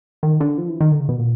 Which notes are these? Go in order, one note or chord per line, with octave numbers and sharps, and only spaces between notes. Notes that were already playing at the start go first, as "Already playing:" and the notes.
D#3
D3
F3
E3
D#3
D3
C#3
B2
A#2